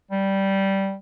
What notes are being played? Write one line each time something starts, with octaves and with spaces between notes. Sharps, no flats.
G3